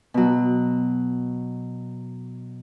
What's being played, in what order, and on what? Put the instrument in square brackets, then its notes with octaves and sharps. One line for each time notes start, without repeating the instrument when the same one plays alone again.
[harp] B2 F#3